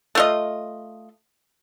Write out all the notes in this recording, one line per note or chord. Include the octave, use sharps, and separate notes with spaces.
A3 F4 D#5